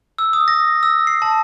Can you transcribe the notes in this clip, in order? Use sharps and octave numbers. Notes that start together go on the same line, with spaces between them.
E6
D#6
A#6
E6
C7
A5